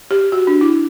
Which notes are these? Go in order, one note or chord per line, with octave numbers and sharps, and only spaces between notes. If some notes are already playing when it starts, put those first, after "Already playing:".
G4
F#4
D4
E4